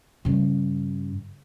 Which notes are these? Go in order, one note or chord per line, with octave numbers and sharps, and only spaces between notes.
G2 C#3